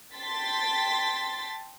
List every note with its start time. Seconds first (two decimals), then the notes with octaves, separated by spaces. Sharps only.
0.17 G5 A5 C6 A6 B6